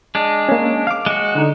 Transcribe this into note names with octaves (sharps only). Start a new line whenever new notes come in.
G#3 D4
A#3 C#4
F5 D6
G#3 F#4
D3 D#4